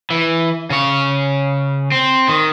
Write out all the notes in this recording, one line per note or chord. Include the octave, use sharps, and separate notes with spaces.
E3
C#3 C#5
C4
D#3